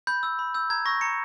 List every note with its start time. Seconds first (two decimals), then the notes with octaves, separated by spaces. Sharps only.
0.07 B5 G6
0.23 E6 G6
0.39 B5
0.54 E6 G6
0.70 A#5 G#6
0.86 C#6 E6 G6 A#6
1.01 A#5 C#7